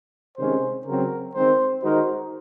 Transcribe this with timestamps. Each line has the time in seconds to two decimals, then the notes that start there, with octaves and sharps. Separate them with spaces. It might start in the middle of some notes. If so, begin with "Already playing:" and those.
0.37 C3 D#3 G#3 C#4 C5
0.86 C#3 F#3 C4 A#4
1.35 D#3 G#3 C4 C5
1.82 D#3 G#3 D#4 F#4 A#4 C5